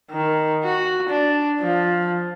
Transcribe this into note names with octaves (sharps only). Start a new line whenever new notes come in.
D#3
F#4
D4
F3